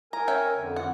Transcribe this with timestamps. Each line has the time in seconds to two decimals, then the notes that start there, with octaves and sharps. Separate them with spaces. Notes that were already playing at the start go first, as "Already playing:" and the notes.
0.13 A#4 G#5 A#5
0.28 C#4 E5 G5
0.57 F2 D3
0.76 F#5